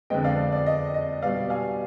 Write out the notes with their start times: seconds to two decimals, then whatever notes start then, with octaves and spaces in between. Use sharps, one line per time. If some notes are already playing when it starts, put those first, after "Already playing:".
0.10 F2 D3 G#3 B3 D#5 G5
0.24 D5 F5
0.39 D5
0.52 D5
0.66 D#5
0.94 D#5
1.22 B2 G3 B3 D5 F5
1.50 F5 G#5